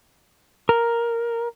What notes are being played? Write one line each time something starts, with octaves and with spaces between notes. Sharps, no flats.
A#4